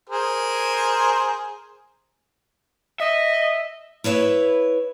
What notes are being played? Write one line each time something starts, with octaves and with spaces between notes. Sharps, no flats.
G#4 A#4 C5
D#5 E5
E4 B4 C#5 D#5 E5